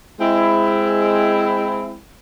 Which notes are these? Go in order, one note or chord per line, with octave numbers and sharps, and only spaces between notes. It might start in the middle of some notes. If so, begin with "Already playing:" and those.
G#3 C4 E4